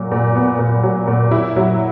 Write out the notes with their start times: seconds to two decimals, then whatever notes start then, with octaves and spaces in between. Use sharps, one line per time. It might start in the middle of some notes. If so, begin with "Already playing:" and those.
Already playing: A#2 F#3
0.12 A#2
0.35 B3
0.59 A#2
0.83 F#3
1.08 A#2
1.31 E4
1.56 F#3